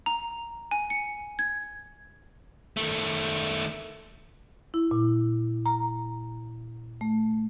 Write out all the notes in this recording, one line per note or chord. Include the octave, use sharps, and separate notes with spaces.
A#5
G#5
C#7
G#6
D#3 A3
E4
A#2
A#5
A3